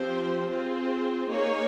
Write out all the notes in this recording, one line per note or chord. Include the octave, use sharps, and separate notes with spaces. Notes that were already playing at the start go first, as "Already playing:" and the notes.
Already playing: F3 C4 G4 C5
C4 F4 G#4 C5
A#3 D#4 G#4 C#5